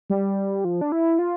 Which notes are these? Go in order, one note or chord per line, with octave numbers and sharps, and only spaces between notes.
G3
F3
D4
E4
F4